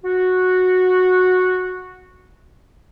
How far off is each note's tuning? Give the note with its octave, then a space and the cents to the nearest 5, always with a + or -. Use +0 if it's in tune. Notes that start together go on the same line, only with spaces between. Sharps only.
F#4 -10